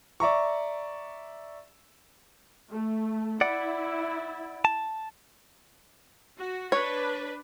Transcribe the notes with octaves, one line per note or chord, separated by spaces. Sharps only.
D5 E5 A#5 C#6
A3
E4 D5 F#5
A5
F#4
D4 B4 C#5